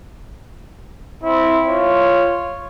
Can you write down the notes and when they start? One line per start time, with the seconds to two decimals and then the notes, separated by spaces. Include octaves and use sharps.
1.23 C4 E4
1.67 F4 C#5